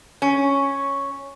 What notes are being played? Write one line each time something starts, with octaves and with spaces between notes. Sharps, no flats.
C#4